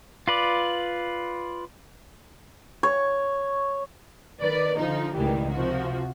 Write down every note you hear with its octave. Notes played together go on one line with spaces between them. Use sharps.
F4 B4 D5
C#5
D#3 B4 D5
D3 F3 D#4
C#2 A2 D#3 E3 G3
C3 F3 F#4